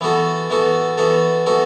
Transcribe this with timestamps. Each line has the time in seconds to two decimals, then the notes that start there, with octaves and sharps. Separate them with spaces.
0.01 E3 B3 F#4 A4
0.50 E3 B3 F#4 A4
0.98 E3 B3 F#4 A4
1.46 E3 B3 F#4 A4